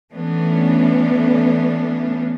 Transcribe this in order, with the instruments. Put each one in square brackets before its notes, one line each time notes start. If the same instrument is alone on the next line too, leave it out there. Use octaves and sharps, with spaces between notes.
[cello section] E3 A3 B3 C#4 D4